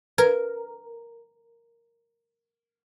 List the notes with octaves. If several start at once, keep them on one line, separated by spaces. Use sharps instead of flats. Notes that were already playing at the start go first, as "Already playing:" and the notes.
A#4 B4